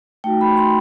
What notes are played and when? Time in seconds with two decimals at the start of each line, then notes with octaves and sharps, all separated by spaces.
0.24 A3 D#4 F#4 G5
0.41 B5
0.57 C6